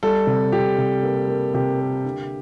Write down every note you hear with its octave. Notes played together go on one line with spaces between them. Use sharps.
G3 A4
C3
C3 G4
C3
A#3
A#3
C3 G4
A#3
D3